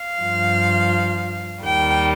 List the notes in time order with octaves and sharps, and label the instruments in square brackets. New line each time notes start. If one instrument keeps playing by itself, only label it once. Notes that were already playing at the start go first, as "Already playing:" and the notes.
Already playing: [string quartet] F5
G2 F3
D#2 D#3 G3 G5